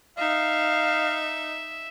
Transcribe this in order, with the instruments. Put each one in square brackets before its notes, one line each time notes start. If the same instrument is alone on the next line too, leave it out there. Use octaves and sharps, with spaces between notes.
[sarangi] D#4 [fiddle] E5 [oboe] F5